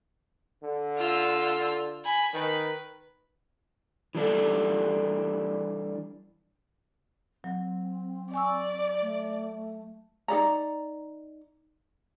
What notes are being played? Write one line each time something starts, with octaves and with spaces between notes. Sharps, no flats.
D3
F4 E6
G#5 B5
D#3 B4
E3 G3 D4 A4
F#3 C4
D5 G#5 C#6 E6
A3
D#4 G#4 D5 A#5